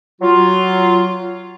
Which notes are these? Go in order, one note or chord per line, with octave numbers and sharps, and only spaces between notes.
F#3 F4